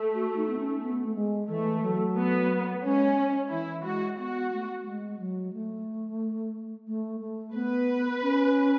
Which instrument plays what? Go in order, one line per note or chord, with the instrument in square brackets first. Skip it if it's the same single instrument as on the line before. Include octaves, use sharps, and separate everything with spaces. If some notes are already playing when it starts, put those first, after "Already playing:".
Already playing: [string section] A3
[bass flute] F#4
D#4
B3
C#4
B3
A3
G#3
[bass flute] E3 [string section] A3
[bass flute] F#3
[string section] B3
[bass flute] G#3 [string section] C#4
[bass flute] E3 [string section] E4
[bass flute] G#3 [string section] F#4
[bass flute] B3 [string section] F#4
[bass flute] A3
G#3
F#3
A3
A3
A3
[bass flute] B3 [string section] B4
[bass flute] C#4